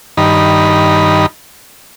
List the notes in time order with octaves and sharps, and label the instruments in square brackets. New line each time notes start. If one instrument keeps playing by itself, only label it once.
[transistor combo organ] G2 D#3 D#4 B5